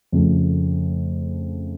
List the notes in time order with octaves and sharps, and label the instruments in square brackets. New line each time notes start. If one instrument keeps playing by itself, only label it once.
[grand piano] F2 C#3 F3 A3